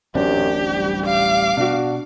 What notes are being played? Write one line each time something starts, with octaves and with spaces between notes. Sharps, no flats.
D1 A1 F#2 C4 D4 G4
G3
F5 D6
B2 D4 F#4